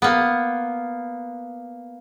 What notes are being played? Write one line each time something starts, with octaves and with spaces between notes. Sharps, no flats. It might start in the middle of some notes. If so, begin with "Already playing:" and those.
A#3 B3